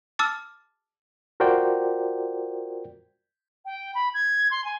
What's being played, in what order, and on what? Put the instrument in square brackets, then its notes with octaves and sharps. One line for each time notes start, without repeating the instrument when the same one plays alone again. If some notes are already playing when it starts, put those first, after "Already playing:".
[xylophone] A5 D6 E6 F6 A6
[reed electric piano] F4 F#4 A#4 C5 D5 G5
[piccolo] G5
B5
G#6
C6
G#5